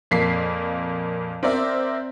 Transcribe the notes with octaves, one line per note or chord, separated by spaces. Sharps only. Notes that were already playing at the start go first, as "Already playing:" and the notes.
F2 A#2 A#3 B6 C7
C4 A#4 D5 E5